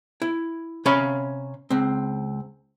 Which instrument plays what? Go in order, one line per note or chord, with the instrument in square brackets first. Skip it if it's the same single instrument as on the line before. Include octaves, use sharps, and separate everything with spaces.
[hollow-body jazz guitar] E4
C3 C#4 C#5 F5 B5
C#2 C4